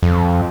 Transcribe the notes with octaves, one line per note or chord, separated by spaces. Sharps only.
F2